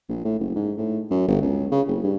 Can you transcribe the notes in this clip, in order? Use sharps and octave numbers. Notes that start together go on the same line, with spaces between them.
A#1
A2
F#1
G#2
A2
F#2
G1
C#2
C#3
F#1
G2